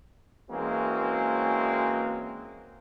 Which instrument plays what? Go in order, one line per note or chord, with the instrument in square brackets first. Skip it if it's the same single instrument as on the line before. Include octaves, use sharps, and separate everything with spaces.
[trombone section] E3 G#3 A#3 C4 C#4 F#4